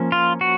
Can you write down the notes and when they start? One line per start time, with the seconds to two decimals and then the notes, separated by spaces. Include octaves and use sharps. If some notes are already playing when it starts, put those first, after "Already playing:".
Already playing: F3 A#3 C#4
0.12 F4
0.41 F#4